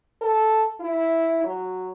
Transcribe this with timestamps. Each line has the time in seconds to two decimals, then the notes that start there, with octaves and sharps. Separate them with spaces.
0.21 A4
0.80 E4
1.43 F#3